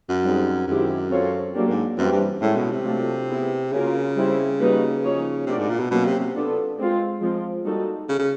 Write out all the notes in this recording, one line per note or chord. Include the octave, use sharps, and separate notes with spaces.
F#2
G3 C4 D#4 G#4
F#2 D#3 G#3 C4 E4 G4
C4 F4 A4 C#5
F#3 A#3 D4 G4
G#2
F#2 E3 G3 C4
G2
A2 G#3 C#4 E4 A4
B2
C3
F#3 A3 D4 F4 A4
B3 E4 G#4
C#3 F#3 A#3 C#4 F4 A#4
G3 C4 E4
G3 A#3 D#4 F#4 B4
F3 A#3 D#4 G#4 C#5
C3 A3 D4 F#4 A#4 D5
G#2
A#2
B2
B2 F#3 A#3 C#4
C3
C3
B3 D4 F4 A4
G#3 C4 F4
F3 G#3 C4 F4
G3 A#3 D#4 F#4 A4
C#3
C#3